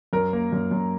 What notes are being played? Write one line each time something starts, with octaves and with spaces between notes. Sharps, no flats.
F#2 A#4
A#3
F#2
F#2